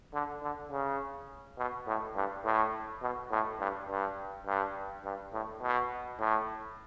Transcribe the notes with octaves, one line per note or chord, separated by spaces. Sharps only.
D3
D3
C#3
B2
A2
G2
A2
B2
A2
G2
G2
G2
G2
A2
B2
A2